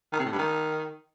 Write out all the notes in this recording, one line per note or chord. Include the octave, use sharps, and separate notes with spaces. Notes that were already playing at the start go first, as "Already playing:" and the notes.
D#3
C3
A2
G2
D#3